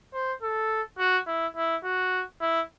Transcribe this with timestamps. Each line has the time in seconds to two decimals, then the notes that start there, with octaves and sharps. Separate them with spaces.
0.13 C5
0.42 A4
0.98 F#4
1.27 E4
1.56 E4
1.84 F#4
2.41 E4